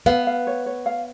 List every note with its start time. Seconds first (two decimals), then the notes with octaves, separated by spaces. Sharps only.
0.06 B3 F5
0.27 F5
0.47 C#5
0.66 C#5
0.86 F5